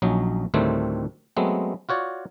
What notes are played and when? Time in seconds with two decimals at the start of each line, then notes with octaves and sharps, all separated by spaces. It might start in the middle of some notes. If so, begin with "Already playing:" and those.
0.02 A#1 F#3 C#4 D#4
0.54 D2 A2 D#3 G3 A3 C4
1.37 F#3 G#3 A3 B3 C4
1.89 F4 F#4 C#5 D5